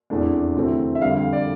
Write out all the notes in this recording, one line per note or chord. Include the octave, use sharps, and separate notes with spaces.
F1 E2 E3 A3 D4
D2 C3 E3 A3 C4
E5
F2 D3 G3 F5
F5
D5